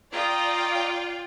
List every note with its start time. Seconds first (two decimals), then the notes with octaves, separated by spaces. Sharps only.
0.13 F4 D5 G5 A#5 D#6